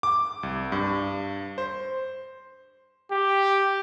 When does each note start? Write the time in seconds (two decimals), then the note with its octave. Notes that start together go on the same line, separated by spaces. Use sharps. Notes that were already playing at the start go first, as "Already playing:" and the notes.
0.03 D6
0.43 C2
0.72 G2
1.58 C5
3.12 G4